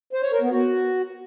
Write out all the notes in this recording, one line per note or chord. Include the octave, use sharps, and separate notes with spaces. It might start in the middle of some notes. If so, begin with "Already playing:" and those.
C5
C#5
A#4
B3
F#4